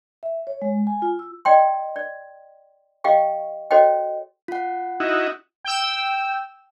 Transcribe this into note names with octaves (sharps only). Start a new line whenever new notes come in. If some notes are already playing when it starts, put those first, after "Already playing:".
E5
C#5
G#3
G#5
F4
E6
D5 D#5 G5 C6
D5
G4 D#5 F5 G5 C#6
F#4 A4 C5 C#5 D#5 G5
F4 F#5
D#4 E4 F#4
G5 E6